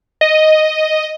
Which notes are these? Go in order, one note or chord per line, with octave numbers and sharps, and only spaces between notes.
D#5